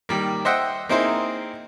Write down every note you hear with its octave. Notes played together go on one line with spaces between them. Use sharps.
D#3 G3 A#3
C5 D#5 E5 F#5 G5
A#3 C4 D#4 E4 G#4 C5